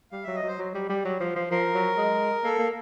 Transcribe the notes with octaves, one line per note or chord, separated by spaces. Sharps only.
G3 F5
F#3 E5
D#5
F#3 C5
F#3
G3
G3
F#3
F3
F3
F3 A#4
F#3
G#3
A#3 A4
A#3